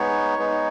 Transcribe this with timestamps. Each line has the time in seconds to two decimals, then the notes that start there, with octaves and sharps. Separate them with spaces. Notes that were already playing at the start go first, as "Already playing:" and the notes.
Already playing: G#3 B3 D#4 C#5
0.39 G#3 B3 D#4